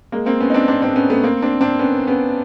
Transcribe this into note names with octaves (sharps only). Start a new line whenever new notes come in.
G#3 A#3
A#3 C4
B3 C#4
D#4
C4 D4
C4 D4
C4 D4
B3 C#4
A3 B3
A#3 C4
C4 D4
C4 D4
B3 C#4
B3 C#4